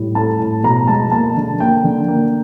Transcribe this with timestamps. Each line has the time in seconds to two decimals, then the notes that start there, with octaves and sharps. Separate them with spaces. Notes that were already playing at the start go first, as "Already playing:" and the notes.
Already playing: A2 G3
0.15 A3 A5
0.40 A2
0.63 B2 A#5
0.87 G#3 A5
1.12 A#3 A5
1.37 D3
1.60 A#3 G5
1.84 D3
2.08 A#3